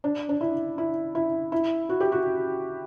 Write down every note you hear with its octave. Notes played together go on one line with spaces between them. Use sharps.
D4
D4
E4
E4
E4
E4
F#4
G4
F#4